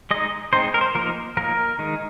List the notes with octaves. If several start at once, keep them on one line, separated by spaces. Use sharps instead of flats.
G#3 D#4 D#5
G#3 C4 D#4 C5
A#4
C5
F3 A#3 D#4 A#4
F3 A#3 D#4 A#4
D#3 G#3 D#4